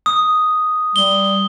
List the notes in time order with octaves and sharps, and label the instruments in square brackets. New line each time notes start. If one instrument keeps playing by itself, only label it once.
[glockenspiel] D#6
[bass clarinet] G3 [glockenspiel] G7